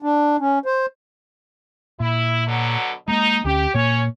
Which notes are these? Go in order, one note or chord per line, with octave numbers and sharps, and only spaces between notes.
D4
C#4
C5
A#2 E4
B2 D3 F#3
G#3 A#3 D#4
D2 C#4 G4
A#2 A#3 C#4 C#5